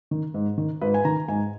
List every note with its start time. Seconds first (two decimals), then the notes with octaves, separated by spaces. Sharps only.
0.11 D#3
0.34 G#2
0.58 D#3
0.81 G#2 B4
0.94 G#5
1.05 D#3 A#5
1.28 G#2 G#5